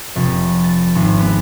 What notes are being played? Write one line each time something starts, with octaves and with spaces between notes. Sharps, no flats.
F1
A6
G#1
B3